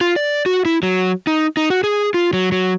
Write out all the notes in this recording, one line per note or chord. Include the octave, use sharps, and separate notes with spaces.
F4
D5
F#4
E4
F#3
D#4
D#4
F#4
G#4
F4
F#3
F#3